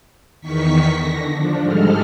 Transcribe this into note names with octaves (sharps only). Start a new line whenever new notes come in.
E2 D#3 C#6 B6
D3 A#6
F3 D4
G#2 G3 G#3 A4 F6